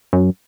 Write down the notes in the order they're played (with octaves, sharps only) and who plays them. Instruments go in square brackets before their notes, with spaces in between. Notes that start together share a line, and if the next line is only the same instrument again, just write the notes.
[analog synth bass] F#2